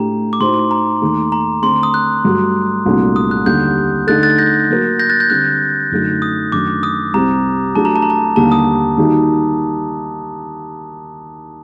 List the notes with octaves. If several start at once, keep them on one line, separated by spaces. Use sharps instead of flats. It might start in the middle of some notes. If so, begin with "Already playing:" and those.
Already playing: A2 A3 D4 G4 A#5
D6
A2 A3 D#4 F#4 C5 C6
A#5
D#2 D#3 A3
A#5
D3 A3 C4 C6
D#6
F#6
G2 F#3 A3
C2 A#2 F#3 A3 D4
D#6
F#6
D#2 D3 G3 G6
D3 A3 D#4 A4 F#6 A6
F#6 A6
G6 A#6
F#3 A#3 F#4 A#4
G6 A#6
F#6 A6
G6
D3 G3 C4 F#6
F#2 D3 F#3 A3 D#4
D#6
F#2 D#3 A3 D4 D6
D#6
C2 C3 G3 C4 A#5
F#3 A3 D4 G4 A5
A#5
A5
A#5
A5
D#2 D3 G3 A#3 A5
D#6
D#3 G3 A#3 D#4 F#4